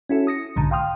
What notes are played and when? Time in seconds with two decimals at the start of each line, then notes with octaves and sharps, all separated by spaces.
0.09 C#4 E4 F#4 A4
0.27 D#6 A#6 C#7
0.56 B1 G#2 D3 A#5
0.71 F5 G5 C6 D#6 F6